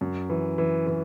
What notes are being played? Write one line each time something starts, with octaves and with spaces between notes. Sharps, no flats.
F#2
E3
E3
E3